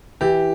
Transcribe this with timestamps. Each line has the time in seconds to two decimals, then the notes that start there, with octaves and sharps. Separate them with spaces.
0.21 E3 G4